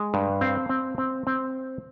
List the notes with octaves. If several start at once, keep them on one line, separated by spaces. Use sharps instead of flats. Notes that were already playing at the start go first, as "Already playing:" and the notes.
Already playing: G#3
G2
C4 F5
C4
C4
C4